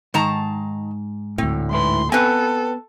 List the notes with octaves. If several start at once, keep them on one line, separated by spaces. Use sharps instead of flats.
G#2 D#3 A5 A#5
D2 A2 C4
G#2 E4 B4 C6
B3 C4 A4 B4 F#5 G#5